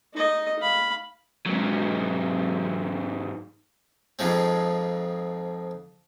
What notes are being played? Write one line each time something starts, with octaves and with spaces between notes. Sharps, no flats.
D#4 D#5
F5 B5
G#2 F#3
F2 G#2 F3 G#3 C4